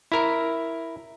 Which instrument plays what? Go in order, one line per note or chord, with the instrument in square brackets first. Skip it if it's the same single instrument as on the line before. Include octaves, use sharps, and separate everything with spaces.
[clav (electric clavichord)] E4 A#4